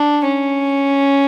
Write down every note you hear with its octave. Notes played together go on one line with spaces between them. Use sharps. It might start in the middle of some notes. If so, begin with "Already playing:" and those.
Already playing: D4
C#4